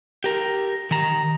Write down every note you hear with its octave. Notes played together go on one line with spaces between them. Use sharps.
G4 A#4
D#3 A#5